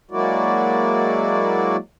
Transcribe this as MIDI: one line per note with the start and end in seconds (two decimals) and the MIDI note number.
0.11 1.76 54
0.11 1.76 56
0.11 1.76 58
0.11 1.76 64
0.11 1.76 66
0.11 1.76 74